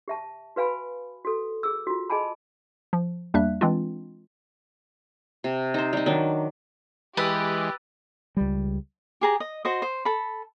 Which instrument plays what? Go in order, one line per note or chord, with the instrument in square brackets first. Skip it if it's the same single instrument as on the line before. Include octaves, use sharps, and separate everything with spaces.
[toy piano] G4 E5 A5
F#4 B4 F5 G#5 B5
F#4 A4
G#4 E6
F4 F#4
G#4 D#5 G#5 A5 B5
[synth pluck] F3
E2 G3 A#3 D4 E5 F#6
E3 G#3 C4 D4 F4
[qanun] C3
D#4 C5
G3 D#4
D#3 F#3 D4
[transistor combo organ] E3 G#3 [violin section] G4 [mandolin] B4 [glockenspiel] E6 F#6 A6
[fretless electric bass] C#2 G3
[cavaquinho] G4 G#4 A#5
D#5
F#4 C5 D#5
C5
A4 B5